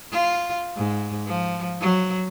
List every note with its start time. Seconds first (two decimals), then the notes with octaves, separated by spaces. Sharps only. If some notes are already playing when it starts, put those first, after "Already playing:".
0.12 F4
0.77 G#2
1.27 F3
1.81 F#3